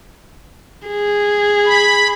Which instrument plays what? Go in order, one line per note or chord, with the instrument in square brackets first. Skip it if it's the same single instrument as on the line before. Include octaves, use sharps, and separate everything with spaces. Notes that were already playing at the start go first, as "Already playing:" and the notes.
[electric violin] G#4
[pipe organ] B5